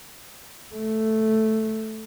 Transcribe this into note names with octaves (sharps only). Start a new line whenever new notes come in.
A3